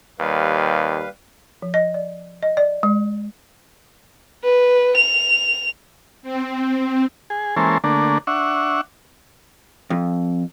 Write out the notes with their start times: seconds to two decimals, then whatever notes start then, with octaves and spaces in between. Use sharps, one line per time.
0.20 D#2 G3 B4 F5
1.62 F3
1.74 D#5
1.94 D5
2.43 D#5
2.57 D5
2.83 G#3
4.44 B4
4.97 F7
6.22 C4
7.30 G#4
7.57 E3 G#3 A#3 C#4 A4 C5
7.84 D3 A3 A#3 D4
8.27 D4 E5 F#5 C#6
9.90 F2